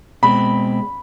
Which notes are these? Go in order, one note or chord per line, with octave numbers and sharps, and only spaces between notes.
B2 G#3 C4 B5